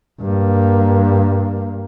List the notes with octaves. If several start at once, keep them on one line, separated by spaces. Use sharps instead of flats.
G2 A#3